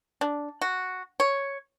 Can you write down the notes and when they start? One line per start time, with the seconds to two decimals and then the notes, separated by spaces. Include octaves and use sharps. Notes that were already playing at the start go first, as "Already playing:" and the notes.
0.21 D4
0.62 F#4
1.20 C#5